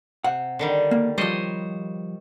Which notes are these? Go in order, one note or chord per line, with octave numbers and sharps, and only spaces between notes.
C3 F#5
D3 D#3 G3
A#3
F3 G3 C5 C#5 D#5